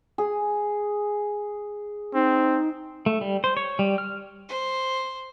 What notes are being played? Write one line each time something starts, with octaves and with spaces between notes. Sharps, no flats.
G#4
C4 D#4
A3
G3
C5
C#5
G3
F6
C5